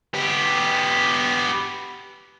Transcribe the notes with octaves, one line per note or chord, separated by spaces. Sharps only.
B3 G4